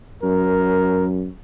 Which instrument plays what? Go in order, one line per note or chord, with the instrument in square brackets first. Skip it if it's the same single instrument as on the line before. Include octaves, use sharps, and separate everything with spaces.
[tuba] F#2 [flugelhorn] A#4